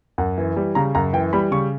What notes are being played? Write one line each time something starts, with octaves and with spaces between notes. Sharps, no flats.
F#2 F#5
E3
G3
C#3 A#5
F#2 A#5
E3 G5
G3 B5
C#3 C#6